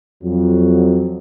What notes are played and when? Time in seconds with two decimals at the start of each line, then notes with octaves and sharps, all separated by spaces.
0.23 F2 F#3